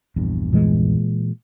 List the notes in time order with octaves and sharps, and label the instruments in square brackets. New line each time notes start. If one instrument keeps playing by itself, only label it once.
[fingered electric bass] A#1 E2 G2
[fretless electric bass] A#2 E3 G#3